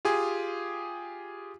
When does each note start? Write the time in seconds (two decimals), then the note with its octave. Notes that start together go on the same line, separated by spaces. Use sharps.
0.05 F4 G4 G#4 G#5